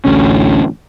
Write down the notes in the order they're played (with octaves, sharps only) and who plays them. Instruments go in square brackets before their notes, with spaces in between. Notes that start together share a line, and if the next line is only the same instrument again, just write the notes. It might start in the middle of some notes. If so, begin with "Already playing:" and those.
[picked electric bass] A1 D2 C#4